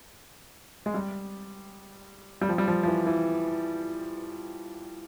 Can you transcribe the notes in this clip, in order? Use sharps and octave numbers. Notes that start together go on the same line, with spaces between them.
G#3
G3
G3
F3
G3
F3
F3
E3
E3